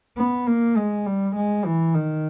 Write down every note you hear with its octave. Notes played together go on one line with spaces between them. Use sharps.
B3
A#3
G#3
G3
G#3
E3
D#3